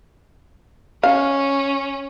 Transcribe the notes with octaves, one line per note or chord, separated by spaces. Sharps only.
C#4 F5